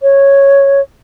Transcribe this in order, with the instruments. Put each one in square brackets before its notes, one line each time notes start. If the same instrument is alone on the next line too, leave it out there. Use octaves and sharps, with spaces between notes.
[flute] C#5